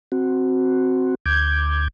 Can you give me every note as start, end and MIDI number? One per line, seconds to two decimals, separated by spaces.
0.12 1.15 60
0.12 1.15 66
1.26 1.88 38
1.26 1.88 86
1.26 1.88 91
1.26 1.88 92